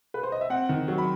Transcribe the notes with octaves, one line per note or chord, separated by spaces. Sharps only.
B4
C5
D#5
E5
C4 F#5
D#3
F#3
B5